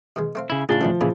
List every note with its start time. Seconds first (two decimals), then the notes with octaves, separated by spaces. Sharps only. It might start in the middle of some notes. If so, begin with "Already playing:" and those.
0.16 B2 D#3 G#3
0.35 A3 C4 F5
0.50 C#3 E4
0.69 A2 C#3 D4 F4 G#4 D#6 A6 G7
0.81 D2 B2 F3 A3
1.01 A#2 C#3 E3 D4 E4 G#4